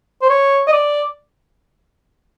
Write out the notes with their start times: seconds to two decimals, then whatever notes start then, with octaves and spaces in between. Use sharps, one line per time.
0.22 C5
0.30 C#5
0.68 D#5
0.73 D5